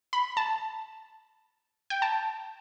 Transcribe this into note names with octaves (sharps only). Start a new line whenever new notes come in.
B5
A5
G5
A5